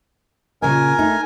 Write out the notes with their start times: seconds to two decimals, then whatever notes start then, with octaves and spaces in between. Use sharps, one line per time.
0.62 A#2 C#3 A#4 D#5 G#5
0.99 A3 D#4